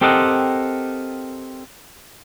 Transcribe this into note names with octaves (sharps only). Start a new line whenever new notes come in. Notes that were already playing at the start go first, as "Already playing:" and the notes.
C4 G4 A4 A#4 D#5 F#5